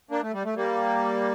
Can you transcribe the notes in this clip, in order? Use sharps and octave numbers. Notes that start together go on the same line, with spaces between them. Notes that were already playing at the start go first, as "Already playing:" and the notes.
A#3 D4
A3
G3
A3
G3 A#3